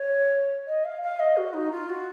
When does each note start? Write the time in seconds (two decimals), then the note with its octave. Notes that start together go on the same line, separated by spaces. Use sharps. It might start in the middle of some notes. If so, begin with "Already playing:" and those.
Already playing: C#5
0.67 D#5
0.84 F5
1.02 F5
1.19 D#5
1.36 F#4
1.53 D#4
1.71 F4
1.89 F#4